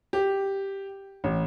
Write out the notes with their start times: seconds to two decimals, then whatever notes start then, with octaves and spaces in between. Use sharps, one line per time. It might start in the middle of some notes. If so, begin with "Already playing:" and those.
0.13 G4
1.24 A1